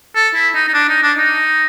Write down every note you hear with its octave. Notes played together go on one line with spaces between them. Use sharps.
A4
E4
D#4
D#4
D4
D#4
D4
D#4